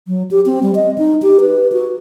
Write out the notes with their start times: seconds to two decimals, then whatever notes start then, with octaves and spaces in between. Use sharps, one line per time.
0.07 F#3
0.31 G4
0.46 C4
0.63 G3
0.75 D#5
0.98 D#4
1.22 G4
1.40 B4
1.72 F#4